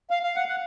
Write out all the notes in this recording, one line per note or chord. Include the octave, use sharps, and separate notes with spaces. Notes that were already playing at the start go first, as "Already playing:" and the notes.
F5
F5
F#5
F#5